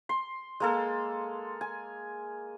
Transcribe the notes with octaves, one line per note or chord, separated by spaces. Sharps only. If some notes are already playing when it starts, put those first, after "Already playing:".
C6
G#3 A#3 A4
G#5